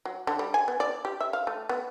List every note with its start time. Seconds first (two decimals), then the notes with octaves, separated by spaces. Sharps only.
0.05 F#3
0.27 D3
0.39 G3
0.54 G#5
0.68 B3
0.80 D5
1.05 G4
1.21 E5
1.33 F5
1.47 A3
1.69 B3